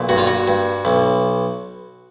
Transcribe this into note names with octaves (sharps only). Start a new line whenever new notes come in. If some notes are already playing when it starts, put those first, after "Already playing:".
Already playing: B1 A#2
G2 F#4
F4
F#4
G2
B1